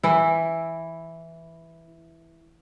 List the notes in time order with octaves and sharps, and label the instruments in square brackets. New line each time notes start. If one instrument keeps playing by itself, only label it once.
[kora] E3 E4